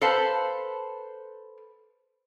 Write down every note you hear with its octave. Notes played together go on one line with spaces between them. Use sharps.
A4 B4 C5 F5 A5